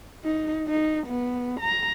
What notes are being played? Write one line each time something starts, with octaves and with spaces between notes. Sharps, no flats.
D#4
D#4
B3
A#5